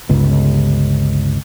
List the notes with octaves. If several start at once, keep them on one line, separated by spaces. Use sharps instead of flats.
G1 C#2